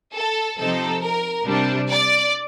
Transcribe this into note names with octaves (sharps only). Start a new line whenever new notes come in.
A4
C3 F3 C4 D#4 A4
A#4
C3 G3 D4
D5